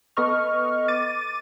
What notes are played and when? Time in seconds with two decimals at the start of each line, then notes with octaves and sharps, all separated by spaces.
0.17 B3 A4 B4 D#5 C#6 F6
0.88 D6 A6 D#7